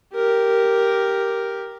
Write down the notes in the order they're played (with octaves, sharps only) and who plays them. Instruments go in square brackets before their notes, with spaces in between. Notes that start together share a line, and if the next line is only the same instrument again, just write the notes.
[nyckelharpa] G4 A#4